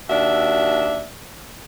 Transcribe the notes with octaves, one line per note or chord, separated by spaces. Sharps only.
D#2 D4 F#4 E5